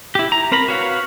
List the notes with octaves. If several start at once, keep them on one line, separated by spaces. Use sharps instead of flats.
E4 G4
A#5
C4 A#4 A#5 B5
F#4 B4 C#5 F5